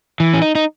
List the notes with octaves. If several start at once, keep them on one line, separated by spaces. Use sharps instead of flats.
E3
C#4
D#4
D#4